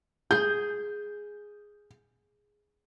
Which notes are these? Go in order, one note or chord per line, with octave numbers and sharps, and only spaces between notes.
G#4 G6